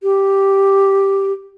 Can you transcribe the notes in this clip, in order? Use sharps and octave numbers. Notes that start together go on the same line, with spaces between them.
G4